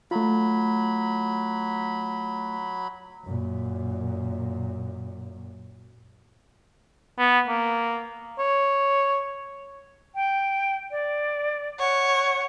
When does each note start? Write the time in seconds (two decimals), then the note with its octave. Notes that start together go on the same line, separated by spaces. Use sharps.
0.11 F#3 A3 F4 B5
3.25 F#2 A#2
7.19 B3
7.48 A#3
8.39 C#5
10.15 G5
10.91 D5
11.79 C#5 F#5